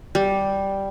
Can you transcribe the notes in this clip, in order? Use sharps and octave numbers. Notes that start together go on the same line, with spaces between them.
G3